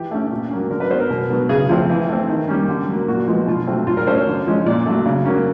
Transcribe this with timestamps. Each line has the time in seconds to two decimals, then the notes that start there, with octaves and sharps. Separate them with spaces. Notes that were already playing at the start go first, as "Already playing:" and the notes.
Already playing: E3 G4
0.11 A3 C#4
0.31 A#2
0.51 F#3 A#3 C#4
0.71 D3 A#4
0.80 B4
0.90 F#3 B3 C5
1.00 A#4
1.10 B2
1.30 F#3 B3
1.49 C#3 G#4
1.69 F3 A3 C4
1.89 E3
2.09 A3 C4
2.29 D#3
2.48 G3 A#3 C#4
2.68 D3
2.88 F#3 A#3
3.08 A#2 F#4
3.28 F3 G#3 B3
3.47 B2 F4
3.67 F#3 A3 C4
3.87 A2 F4
3.97 A#4
4.07 F#3 A3 C#4 C5
4.17 C#5
4.27 D3
4.47 F3 G#3 C#4
4.66 A#2 D5
4.86 F#3 A3
5.06 C#3
5.26 F#3 A#3 C#4